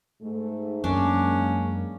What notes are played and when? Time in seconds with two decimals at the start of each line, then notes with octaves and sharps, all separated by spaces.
0.21 G#2 A3
0.84 F#2 G#3 A#3 C#4 D4